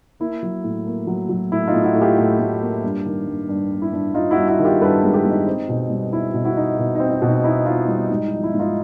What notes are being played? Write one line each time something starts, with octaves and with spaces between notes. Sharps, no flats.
A#3 E4
F#3
A2
A#3
F#3
F#3
A2 E4
D#4 F4
A2
E4 F#4
A2
F4 G4
A2
A2
A#3
G2
D#3
G2
G2
G2
E4
G2
G2 D#4 F4
E4 F#4
G2
E4 F#4
D#3
F4 G4
G2 A4 B4
G#3
G4 A4
G#3
D#4
C4
B2
G3
D#4 E4
B2
E4 F#4
D#4
B2
C4 D#4
D#4
B2
D#4
D#4 E4
D#4 F4
G3 E4
G#2 D#4
E4
F3
E4
G#2
D#4 F4